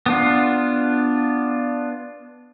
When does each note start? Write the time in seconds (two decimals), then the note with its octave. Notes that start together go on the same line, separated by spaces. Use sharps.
0.06 B3 D4 F4